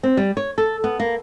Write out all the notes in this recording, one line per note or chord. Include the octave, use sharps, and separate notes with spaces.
C4
G3
C#5
A4
B3
A#3